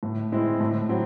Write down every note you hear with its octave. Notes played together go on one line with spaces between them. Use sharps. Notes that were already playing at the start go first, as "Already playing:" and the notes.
A2
G#3 C4 E4
A2
F#3 C4 E4